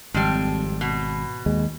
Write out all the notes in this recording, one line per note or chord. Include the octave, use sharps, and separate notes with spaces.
G#1 F2 G3
B2
D#2 G#3